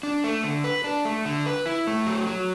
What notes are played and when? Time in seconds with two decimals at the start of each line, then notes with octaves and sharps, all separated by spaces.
0.03 D4
0.24 A3
0.44 D3
0.64 B4
0.84 D4
1.05 A3
1.25 D3
1.46 B4
1.66 E4
1.87 A3
2.06 F#3
2.27 F#3